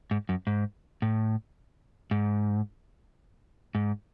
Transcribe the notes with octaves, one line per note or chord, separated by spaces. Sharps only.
G#2
F#2
G#2
A2
G#2
G#2